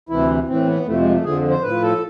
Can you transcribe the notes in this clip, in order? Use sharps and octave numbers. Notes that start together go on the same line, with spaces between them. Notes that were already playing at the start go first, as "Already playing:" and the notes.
D2 C3 E3 E4
A2 E3 C4
B3
F2 C3 F3 A3
G#3
A3
F2 D3 F3 G#4
C5
A2 F3 B4
A4